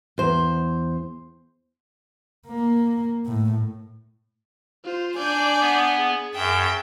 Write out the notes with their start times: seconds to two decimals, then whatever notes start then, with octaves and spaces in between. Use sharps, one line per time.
0.18 E2 C5
2.48 A#3
3.26 A2
4.84 F4 C5
5.18 D4 D5 G#5 G6
5.60 B3
5.98 G#4
6.35 F#2 E5 G5